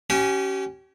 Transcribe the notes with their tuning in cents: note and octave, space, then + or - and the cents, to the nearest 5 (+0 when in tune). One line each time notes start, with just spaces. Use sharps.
C#4 +0 G4 -35 G#5 +0